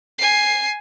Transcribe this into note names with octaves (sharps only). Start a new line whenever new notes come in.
G#5 C7